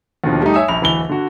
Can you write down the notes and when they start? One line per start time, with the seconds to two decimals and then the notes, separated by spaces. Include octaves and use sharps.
0.24 D#2 B2 D3 F3
0.42 G3 A3 D#4
0.54 C#5 E5 G#5 D#6
0.68 A#1 B5 F7
0.81 D1 E3 B5 F7 G7
1.09 D3 F#4